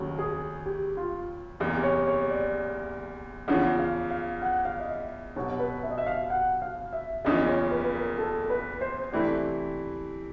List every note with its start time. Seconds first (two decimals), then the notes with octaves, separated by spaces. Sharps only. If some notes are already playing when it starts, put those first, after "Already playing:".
Already playing: F1 D#2 C#3 F#3
0.19 G#4
0.66 G4
0.97 F4
1.60 F#1 E2 C3
1.83 C#5
2.07 C#5
2.30 D5
3.48 E2 C#3 F3 F#5
3.79 F5
4.11 F5
4.42 F#5
4.65 F5
4.79 D#5
4.89 E5
5.36 C2 B2 F#3 C#5
5.59 B4
5.83 E5
5.90 D#5
5.98 E5
6.07 F5
6.30 F#5
6.62 F5
6.93 E5
7.25 F#1 E2 C#3 F3 D#5
7.48 C#5
7.71 B4
7.84 B4
7.95 A#4
8.18 A4
8.50 B4
8.81 C5
9.12 C3 E3 A3 C4 E4 D5